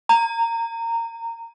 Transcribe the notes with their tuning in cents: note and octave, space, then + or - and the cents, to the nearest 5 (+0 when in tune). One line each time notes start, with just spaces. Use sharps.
A#5 -20